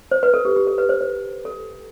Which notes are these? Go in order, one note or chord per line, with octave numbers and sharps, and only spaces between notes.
C5
B4
A4
G4
G4
A4
B4
C5
C5
A4